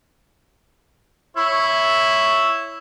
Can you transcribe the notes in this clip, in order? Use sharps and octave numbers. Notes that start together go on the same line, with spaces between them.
E4 C#5